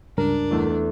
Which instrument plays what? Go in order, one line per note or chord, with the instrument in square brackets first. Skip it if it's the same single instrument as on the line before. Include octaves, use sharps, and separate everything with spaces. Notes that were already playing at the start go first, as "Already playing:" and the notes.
[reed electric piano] C#2 G2 A#4 [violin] D4
[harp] E2 A3 E4